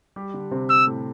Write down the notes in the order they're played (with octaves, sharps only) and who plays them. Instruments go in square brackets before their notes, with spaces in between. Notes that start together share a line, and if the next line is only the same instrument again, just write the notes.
[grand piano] G3 G4
D3 D4
C3 C4
[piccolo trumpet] E6
[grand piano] A2 A3